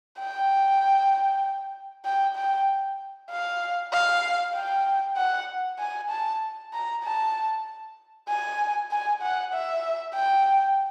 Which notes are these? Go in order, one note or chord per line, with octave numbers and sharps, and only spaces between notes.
G5
G5
G5
F5
F5
G5
F#5
G#5
A5
A#5
A5
G#5
G#5
F#5
E5
G5